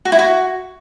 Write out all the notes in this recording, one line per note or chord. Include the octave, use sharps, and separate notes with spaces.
F#4
E4
F#4